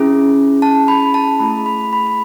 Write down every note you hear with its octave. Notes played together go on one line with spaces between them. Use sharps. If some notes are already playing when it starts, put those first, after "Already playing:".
Already playing: C#4 E4 G#4
A5
B5
A5
A3 E4 G#4 B5
B5
B5
B5